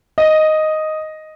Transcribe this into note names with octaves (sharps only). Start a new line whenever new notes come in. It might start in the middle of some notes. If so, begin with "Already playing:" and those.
D#5